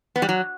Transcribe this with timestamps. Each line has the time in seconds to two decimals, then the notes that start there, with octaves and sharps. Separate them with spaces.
0.16 B3
0.22 G3
0.29 F#3